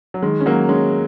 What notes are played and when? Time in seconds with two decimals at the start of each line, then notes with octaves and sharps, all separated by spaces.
0.14 F#3
0.22 D#3 G#3
0.40 C#4
0.46 F#3 A#3
0.69 G#3 C#4